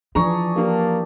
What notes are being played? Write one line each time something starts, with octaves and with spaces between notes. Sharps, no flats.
E3 F3 D4 G#4 A#5 C#6
A#3 D4 G4